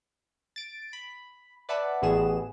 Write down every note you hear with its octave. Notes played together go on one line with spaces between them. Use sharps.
A6 D7
B5
B4 D5 E5 F#5 A5 B5
A1 A2 E3 B3 G#4 E7